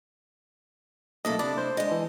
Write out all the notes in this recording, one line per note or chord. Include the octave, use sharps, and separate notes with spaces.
B1 A3 A#3 E4 A4 D#5
C3 D4 E4 D5
C5
G#3 D4 D#5
E3